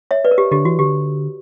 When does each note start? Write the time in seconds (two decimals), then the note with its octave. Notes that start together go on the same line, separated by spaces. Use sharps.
0.11 C#5 E5
0.25 B4 D5
0.31 A#4
0.38 G4
0.52 D3 G4
0.65 E3 F#4
0.79 D3 G4